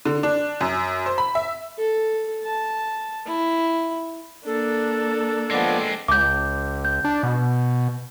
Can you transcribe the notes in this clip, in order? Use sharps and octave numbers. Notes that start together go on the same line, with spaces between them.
D3
D4
F#2
C5
B5
E5
A4
A5
E4
A#3 D4 A4
F3 G#3 B3 C4 D5
C#2 D6 G6
G6
D4
B2